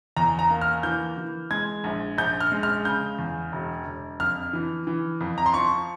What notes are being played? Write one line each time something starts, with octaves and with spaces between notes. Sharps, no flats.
E2 A#5
A#5
A#3
F6
E3 G6
E3
G#3 G#6
A#1
A#1 G6
F6
G#3
F6
C#3 G6
E2
E1
E1
F2 F6
E3
E3
F2
A#5
C6
F3 C#6